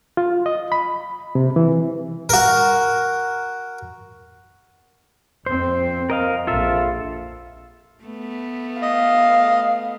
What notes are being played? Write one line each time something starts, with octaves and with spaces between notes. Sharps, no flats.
F4
D#5
B5
C3
E3
F#4 A#4
F2 C4 C5
A#4 D#5 F5
A#1 F4 A4 E5
A3 B3
D#5 F5